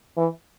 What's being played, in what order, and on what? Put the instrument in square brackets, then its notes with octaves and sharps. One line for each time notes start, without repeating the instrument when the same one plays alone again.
[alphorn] E3